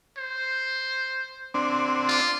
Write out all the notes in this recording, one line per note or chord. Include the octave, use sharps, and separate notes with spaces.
C5
C4 D4
F4